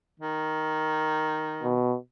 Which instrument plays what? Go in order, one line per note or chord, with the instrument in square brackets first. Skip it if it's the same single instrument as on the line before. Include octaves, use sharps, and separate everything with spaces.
[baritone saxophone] D#3
[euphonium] B2